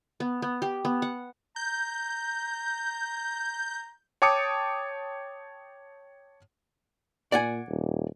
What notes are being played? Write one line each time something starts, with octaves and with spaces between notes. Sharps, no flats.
B3
B3
G4
B3
F#5
A#5 G6
C#5 G5 A5 D6 D#6 C#7
A#2 D5 F#5 G#5
D#1